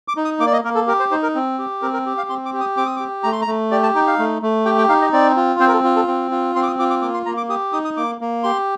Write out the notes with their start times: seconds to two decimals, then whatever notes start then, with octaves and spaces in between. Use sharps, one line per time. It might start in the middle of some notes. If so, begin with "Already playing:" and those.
0.08 D6
0.17 D#4
0.25 D#6
0.40 A#3 D6
0.47 D5
0.53 D#5
0.64 A#3 A#4
0.75 A4
0.87 G4 A#4
1.00 C5
1.11 D#4 C5
1.23 A#4
1.35 C4
1.59 G4
1.82 C4 A#4
1.93 A#4
2.06 G4
2.18 F5
2.30 C4 C6
2.45 D6
2.53 G4
2.60 D#6
2.77 C4 D6
2.86 D#6
2.96 D6
3.00 G4
3.23 A3 A#5
3.32 C6
3.42 A#5
3.47 A3
3.71 G4 D5
3.83 A5
3.95 D#4 G5
4.07 F5
4.19 A3
4.42 A3
4.65 G4 G5
4.78 G5
4.89 D#4 F5
5.01 D#5
5.12 C4 D5
5.37 F4
5.60 C4 C5
5.68 A#4
5.72 A4
5.84 F4
5.96 A4
6.07 C4
6.31 F4
6.55 C4 C6
6.63 D6
6.67 D#6
6.79 F4 D6
6.90 D6
7.02 A#3 D6
7.14 C6
7.26 A#3 A#5
7.37 D6
7.49 G4 D#6
7.72 D#4 D#6
7.85 D#6
7.97 A#3 D6
8.21 A#3
8.43 G4 C6